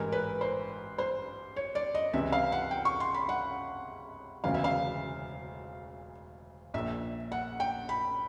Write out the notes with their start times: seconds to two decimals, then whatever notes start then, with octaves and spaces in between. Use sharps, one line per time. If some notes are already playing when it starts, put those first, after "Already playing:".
Already playing: A1 G#2 E3 A#4
0.12 B4
0.41 C5
0.98 C5
1.56 C#5
1.75 D5
1.95 D#5
2.13 C#2 C3 E3 E5
2.32 F5
2.52 F#5
2.71 G5
2.85 C#6
3.00 C6
3.14 B5
3.29 F#5
4.44 E1 D2 C#3 E3 F5
4.54 E5
4.64 F5
6.74 A#1 A#2 E5
7.32 F#5
7.60 G5
7.89 B5